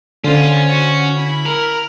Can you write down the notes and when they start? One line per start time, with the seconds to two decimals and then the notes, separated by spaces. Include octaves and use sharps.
0.24 D3 C#4 F4 C5
0.69 F#4 F#5
1.15 E4 B5
1.46 A#4